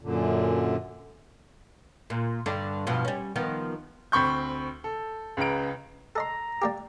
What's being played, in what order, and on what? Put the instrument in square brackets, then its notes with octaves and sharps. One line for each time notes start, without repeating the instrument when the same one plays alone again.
[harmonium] F#2 A#2 D3
[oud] A#2
G2 D3 D4
G2 B2 F3
G3 C#4
D#3 F3 B3
[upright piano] D2 C4 B5 C#6 G6
A4
C#2 C#3 B4 A#5 D7
[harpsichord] A4 D#5 C6 [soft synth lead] A#5
[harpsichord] G3 A#3 G4